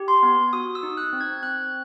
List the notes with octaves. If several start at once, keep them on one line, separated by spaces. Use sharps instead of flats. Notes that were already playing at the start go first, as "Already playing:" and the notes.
Already playing: G4
C6
B3
F#4 D#6
E6
D#4
F#6
C4
G#6
C4 F#6